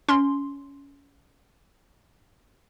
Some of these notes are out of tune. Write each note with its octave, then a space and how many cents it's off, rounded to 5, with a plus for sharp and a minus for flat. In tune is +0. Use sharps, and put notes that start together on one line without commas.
C#4 +20 C6 +0